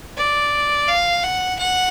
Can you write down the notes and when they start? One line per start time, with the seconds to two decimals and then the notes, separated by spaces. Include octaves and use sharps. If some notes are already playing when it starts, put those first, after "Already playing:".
0.17 D5
0.88 F5
1.23 F#5
1.59 F#5